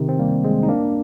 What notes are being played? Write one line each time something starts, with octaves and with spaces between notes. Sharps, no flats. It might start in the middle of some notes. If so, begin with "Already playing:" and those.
Already playing: C3 D#3
C4
G3 A#3
G#3 C4
D#4
A#3 D4